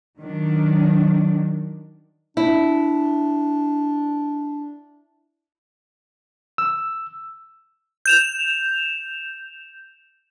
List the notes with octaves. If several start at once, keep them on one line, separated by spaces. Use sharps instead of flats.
D#3 F#3 D4
D4 E4
E6
G6 E7 F7